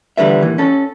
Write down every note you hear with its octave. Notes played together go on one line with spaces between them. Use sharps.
E2 D3 G3 B4 E5
A#2 E3
C#4 A4